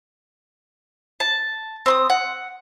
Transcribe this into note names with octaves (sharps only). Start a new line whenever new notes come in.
A5
C4 C6 D#6
F#5